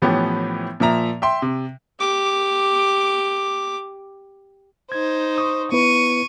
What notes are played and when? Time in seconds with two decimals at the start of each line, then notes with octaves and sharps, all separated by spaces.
0.02 A2 E3 F3 B3 C#4 G4
0.80 A#2 F3 E5 A#5 F7
1.22 E5 G5 C6
1.42 C3
2.00 G4 D6
4.92 D#4 C5 G#6
5.38 C#6 D#6
5.72 B3 E4 B4 C#6 D#7